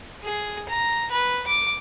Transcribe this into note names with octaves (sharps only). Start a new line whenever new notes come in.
G#4
A#5
B4
D6